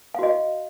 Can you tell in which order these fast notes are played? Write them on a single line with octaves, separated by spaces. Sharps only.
F5 F#4 D#5